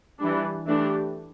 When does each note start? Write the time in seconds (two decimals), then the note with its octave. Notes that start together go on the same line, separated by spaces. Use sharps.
0.19 E3 G3 D4
0.66 E3 A3 D4 G4